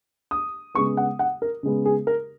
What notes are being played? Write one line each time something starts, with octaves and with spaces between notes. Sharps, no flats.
D#6
C#3 G#3 B3 C#6
F#5
F#5
A#4
C#3 G#3 B3
G#4
A#4